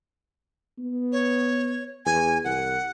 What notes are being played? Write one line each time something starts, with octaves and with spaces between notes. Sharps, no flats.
B3
C#5
E2 G#5
C2 F#5